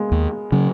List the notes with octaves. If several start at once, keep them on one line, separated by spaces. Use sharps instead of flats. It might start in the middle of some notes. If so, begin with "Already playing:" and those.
Already playing: G#3 A#3 B3
D#2
C#3 F#3